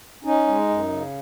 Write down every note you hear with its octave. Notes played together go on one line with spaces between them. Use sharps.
C#4 D#4
G#3
F#2
C#3